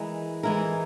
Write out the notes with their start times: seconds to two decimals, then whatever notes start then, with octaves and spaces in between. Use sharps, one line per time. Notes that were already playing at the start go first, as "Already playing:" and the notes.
Already playing: E3 G#3 E4 A#4
0.43 E3 G#3 E4 A#4